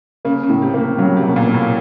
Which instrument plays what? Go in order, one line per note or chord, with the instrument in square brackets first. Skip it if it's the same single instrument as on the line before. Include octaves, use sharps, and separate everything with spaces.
[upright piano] C#3 [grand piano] A#3
[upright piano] C#3
[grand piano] A2
[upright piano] C3
[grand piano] A#3
[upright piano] C3
[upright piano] C#3 [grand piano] F#3
[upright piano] C3
[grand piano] A#3
[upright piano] B2
A#2
[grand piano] A#3
[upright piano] A2